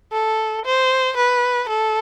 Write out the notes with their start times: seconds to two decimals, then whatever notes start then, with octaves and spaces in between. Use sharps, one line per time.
0.12 A4
0.65 C5
1.17 B4
1.69 A4